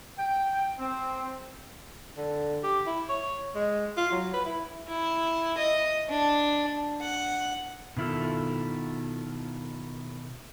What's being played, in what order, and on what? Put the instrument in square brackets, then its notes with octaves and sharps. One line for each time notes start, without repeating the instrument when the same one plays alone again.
[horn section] G5
C4
[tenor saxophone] D3
G4
E4
C#5
G#3
F4
F#3
B4
E4
[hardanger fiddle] E4
D#5
D4
F#5
[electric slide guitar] B2 D#3 E4 F4 A4